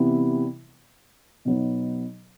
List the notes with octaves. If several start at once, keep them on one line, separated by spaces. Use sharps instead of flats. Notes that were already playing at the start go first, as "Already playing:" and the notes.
Already playing: C3 E3 G3 B3 E4
B2 F#3 B3 D#4